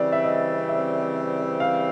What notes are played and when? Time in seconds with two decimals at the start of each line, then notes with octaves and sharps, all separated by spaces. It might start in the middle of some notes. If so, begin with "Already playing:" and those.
Already playing: C#3 E3 G3 C4 D5
0.12 E5
0.24 D#5
0.69 E5
1.60 F5